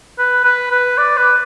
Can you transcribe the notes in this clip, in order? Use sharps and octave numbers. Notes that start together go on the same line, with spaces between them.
B4
B4
B4
D5
B4